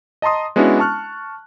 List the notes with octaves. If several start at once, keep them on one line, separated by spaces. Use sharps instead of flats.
D#5 A5 A#5 C6 D#6
G#3 B3 C#4 D4 E4 F#4
A5 C#6 F6 F#6